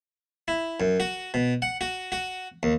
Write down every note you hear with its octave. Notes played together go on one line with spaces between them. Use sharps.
E4
F#2
F#4
B2
F#5
F#4
F#4
D#2